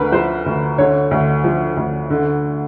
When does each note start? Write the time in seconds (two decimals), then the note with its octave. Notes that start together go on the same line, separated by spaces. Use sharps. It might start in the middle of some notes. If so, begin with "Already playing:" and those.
Already playing: D2 D3 A#4 B4
0.12 F3 C5
0.46 D2
0.78 D3 C#5
1.11 D2
1.44 F3
1.77 D2
2.10 D3